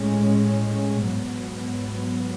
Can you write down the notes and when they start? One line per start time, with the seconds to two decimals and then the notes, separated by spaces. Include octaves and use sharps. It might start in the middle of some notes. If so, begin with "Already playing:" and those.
Already playing: A2 G#3 C#4
1.07 G#2 F#3 B3